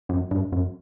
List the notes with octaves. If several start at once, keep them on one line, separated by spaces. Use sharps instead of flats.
F#2
G2
F#2